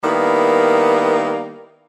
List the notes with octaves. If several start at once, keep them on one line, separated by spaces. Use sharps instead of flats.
D#3 G3 A#3 B3 E4